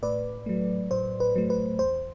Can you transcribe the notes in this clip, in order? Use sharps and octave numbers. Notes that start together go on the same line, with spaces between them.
A2 B4 D5
F#3 A3
A2 C5
B4
F#3 A3
B4
E2 C5